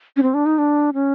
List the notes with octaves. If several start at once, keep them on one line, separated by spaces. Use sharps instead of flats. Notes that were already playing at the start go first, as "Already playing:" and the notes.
C#4
C4
D4
D#4
D4
C#4